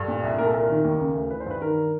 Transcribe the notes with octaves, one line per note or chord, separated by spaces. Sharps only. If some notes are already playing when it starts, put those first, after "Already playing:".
Already playing: G2 A4
A#2
C2
A#2 A#4
A4
C2 A#4
D#3
D#2
C#3
D2
E3 B4
C5
G2 B4
D#3 A#4